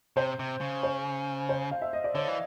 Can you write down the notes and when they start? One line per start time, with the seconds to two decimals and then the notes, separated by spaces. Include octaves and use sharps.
0.17 C3 C5
0.39 C3
0.61 C#3
0.83 C5
1.49 C5
1.71 F5
1.82 E5
1.93 D#5
2.04 D5
2.15 D3 C#5
2.28 E3